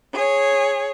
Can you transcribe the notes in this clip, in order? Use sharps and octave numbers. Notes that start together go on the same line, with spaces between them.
G#4 C#5